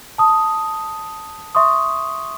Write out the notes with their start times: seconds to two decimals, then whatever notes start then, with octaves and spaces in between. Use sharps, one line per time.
0.18 A5 D#6
1.55 E5 C6 C#6 D#6